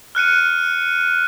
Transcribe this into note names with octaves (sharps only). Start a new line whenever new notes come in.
F6 F#6 C#7 D#7